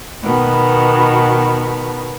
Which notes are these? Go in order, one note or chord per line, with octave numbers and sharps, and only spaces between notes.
B2 D#3 B3